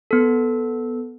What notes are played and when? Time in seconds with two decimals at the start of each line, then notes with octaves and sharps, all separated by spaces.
0.11 B3 A4